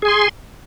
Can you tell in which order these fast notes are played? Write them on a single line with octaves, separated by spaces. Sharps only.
G#4 G#5 C6